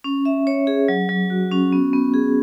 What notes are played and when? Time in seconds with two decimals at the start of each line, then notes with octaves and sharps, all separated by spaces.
0.04 C#4
0.25 E5
0.47 C#5
0.67 G#4
0.88 F#3
1.09 F#3
1.30 F#4
1.51 C#4
1.72 B3
1.93 B3
2.14 G#4